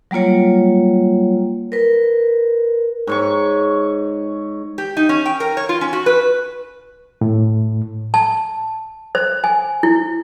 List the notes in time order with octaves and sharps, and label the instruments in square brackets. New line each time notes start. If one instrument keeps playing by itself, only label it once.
[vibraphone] F#3 G3 A#3 F4 C#5
A#4 B4
[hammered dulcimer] G#2 C#5 C#6
[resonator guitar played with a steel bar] G4
D#4
C#4
G5
A#4
C#5
F4
C#4
F#4
B4
[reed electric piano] A2
[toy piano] A5
C5
G#5
E4